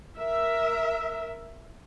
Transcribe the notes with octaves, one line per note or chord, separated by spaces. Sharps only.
A#4 E5